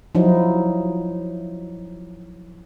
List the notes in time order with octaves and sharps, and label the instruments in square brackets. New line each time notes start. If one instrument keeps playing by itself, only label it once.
[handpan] F3 F#3 D#4 E4